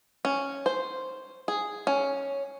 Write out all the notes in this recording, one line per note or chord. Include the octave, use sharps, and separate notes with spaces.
C#4
C5
G#4
C#4